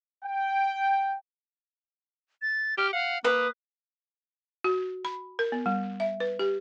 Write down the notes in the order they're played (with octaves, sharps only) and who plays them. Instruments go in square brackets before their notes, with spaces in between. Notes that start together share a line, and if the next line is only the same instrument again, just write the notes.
[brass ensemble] G5
[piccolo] A6
[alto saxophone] G4 [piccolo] F6
[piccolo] F5 [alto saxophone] F#5
[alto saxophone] A#3 [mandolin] B4 [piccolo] D#6
[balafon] F#4
B5
A#4
B3
G3
E5
B4
G4